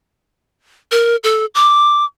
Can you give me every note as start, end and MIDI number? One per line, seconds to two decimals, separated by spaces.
0.92 1.16 70
1.24 1.46 69
1.55 2.05 86